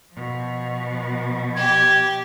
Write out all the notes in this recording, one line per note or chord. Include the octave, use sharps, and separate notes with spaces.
B2 F3
G4 G#6